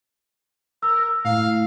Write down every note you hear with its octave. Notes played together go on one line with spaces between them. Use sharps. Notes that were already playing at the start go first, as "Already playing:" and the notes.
A#4 E6
A2 F5